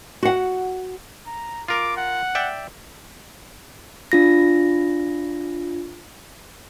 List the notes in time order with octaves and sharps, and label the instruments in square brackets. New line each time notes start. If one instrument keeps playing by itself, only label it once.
[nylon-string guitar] F#4 F#5
[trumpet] A#5
[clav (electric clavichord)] F4 A#4 [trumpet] D6
[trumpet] F#5
[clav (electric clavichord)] D5 E5 G5
[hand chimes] D4 F4 A#6